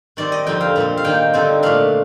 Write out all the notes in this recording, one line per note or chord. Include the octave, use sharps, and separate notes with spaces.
D#3 G3 C4 D5
D#5
F2 D3 G3 C4 D#4 G5
F5
A#2 G3 C4
F5
D#3 A#3 D#4 G5
D3 G3 C4 D#4
A#2 A3 D4 F5